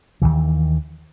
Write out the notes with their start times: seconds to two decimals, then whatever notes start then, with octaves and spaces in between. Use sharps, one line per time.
0.22 D#2 C3 D#3 E3